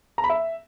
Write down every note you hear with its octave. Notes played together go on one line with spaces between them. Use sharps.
A#5
B5
E5